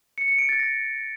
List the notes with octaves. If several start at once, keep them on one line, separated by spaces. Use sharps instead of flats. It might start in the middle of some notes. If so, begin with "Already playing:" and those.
C#7
C#7
D7
A6
A#6